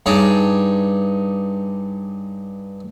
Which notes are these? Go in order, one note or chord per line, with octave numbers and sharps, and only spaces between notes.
G2 D#4 G#4 C#5 A5 D6